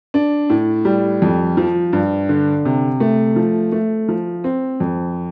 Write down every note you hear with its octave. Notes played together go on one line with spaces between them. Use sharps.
D4
A2
G3
F2
F3
G2
D3
C3
A3
F3
A3
F3
C4
F2